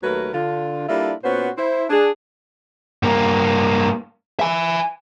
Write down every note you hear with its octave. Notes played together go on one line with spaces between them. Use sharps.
D#2 F#3 A3 A#4 B4
D3 F4
G3 A#3 D4 E4 F4 A4
A#2 B3 C#4 F#4 C5
E4 C5
D4 G#4
G2 A#3
E5 G#5